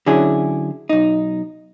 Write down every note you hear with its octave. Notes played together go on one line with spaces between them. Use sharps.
D3 F#3 C#4 E4 G#4
B1 D#4